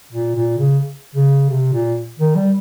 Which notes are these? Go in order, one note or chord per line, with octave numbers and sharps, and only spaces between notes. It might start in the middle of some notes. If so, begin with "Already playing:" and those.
A#2
A#2
C#3
C#3
C3
A#2
D#3
G3